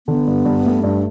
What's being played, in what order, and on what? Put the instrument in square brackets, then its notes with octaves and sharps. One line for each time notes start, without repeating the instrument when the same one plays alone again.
[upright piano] D3 [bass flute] B3
[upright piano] G2
G2
A3
[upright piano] G2 [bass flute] D4